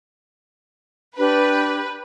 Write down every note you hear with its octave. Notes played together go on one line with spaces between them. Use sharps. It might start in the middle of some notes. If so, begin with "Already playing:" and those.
D4 G4 B4